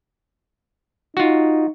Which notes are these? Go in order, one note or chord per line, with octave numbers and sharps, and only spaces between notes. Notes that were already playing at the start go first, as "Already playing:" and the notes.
D#4 F4 F#4